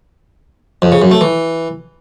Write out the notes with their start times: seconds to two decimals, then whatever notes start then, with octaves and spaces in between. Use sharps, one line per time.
0.82 F2
0.92 C#3
1.02 F#2
1.11 A3
1.21 E3